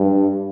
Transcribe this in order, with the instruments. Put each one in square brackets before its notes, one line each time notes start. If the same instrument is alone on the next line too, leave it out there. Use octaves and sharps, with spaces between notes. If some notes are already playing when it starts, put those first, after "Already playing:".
Already playing: [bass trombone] G2